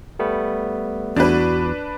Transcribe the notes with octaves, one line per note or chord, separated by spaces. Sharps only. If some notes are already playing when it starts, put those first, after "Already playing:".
G3 A3 B3
E2 D4 F#4 B4